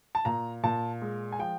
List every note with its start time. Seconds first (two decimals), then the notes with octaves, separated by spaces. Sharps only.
0.15 A5
0.25 A#2 A#5
0.63 A#2 A5
1.02 G#3
1.32 G#5
1.39 F3 G5